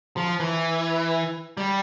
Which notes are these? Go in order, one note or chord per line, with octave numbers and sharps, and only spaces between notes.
F3
E3
G3